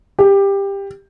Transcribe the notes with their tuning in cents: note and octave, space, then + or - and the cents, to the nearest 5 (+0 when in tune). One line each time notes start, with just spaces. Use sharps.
G4 +15